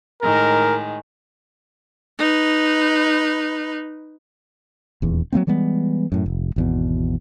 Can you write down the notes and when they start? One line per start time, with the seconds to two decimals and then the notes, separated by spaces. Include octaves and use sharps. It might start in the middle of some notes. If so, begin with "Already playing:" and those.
0.22 A2 D#3 G#3 A#4
2.18 D#4 B4
5.02 D#1 E2
5.32 F#3 A3 A#3 C4
5.47 E3 G3 G#3 B3
6.12 F#2 A2
6.26 F1
6.56 G#1 E2 B2